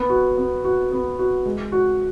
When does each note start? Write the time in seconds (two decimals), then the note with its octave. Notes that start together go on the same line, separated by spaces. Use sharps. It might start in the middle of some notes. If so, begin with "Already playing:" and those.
Already playing: B3
0.09 F#4
0.37 B3
0.65 F#4
0.92 B3
1.19 F#4
1.46 G#3
1.72 F#4